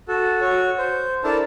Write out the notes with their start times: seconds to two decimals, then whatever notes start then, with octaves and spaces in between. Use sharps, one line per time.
0.08 F#4 A4
0.41 F#4 C#5
0.78 C5
1.24 D4 E4 A4 A#4 A5